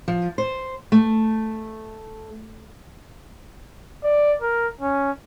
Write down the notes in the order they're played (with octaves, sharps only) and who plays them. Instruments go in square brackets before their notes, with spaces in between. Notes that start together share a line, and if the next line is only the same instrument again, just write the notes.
[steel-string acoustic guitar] F3
C5
A3
[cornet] D5
A#4
C#4